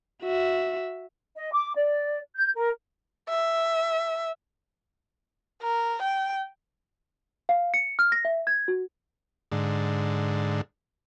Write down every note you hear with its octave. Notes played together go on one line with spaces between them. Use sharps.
F#4 E5
D#5
D6
D5
G6
A#4
E5
A#4
G5
F5
C#7
F6
A#6
E5
G#6
F#4
G#2 D3